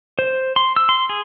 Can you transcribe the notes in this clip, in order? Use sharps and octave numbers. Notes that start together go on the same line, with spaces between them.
C5
C6
E6
C6
G#4